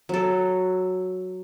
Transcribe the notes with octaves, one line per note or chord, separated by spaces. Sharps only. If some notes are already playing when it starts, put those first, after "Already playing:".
F#3 A4